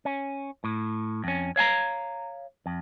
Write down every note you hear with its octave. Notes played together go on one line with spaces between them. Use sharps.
C#4
A2
F2 C#4
C#5 F5 G#5 A#5
F2